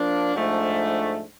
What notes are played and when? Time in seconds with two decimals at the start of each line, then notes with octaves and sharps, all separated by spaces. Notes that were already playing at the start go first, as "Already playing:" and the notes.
Already playing: F3 A#3 D4
0.35 G#2 F3 A3 D4